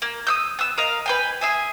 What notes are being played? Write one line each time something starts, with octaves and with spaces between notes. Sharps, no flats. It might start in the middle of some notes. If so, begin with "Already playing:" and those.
A#3
D#6 E6 G6
B3 E6
A#4 D#5 F5
B4 G5 G#5
G#4 E5 G#5